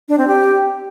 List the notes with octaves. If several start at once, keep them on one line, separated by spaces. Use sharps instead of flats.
D4
C4
G4